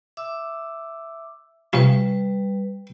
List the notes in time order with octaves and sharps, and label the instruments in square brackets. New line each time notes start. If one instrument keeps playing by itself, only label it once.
[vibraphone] E5 D6 E6
[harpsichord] C3 F3 C#4 [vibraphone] G3 B4